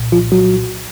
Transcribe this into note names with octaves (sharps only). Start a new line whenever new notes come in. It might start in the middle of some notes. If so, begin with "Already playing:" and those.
Already playing: C2 A#2
F3 F4
F#3 F#4